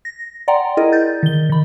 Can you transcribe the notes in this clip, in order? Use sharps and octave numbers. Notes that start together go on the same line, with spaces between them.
A#6
D5 F#5 G5 A#5 C6
E4 G#4 A#4 D5 D#5
G6 A6
D#3 G7
D#3 B5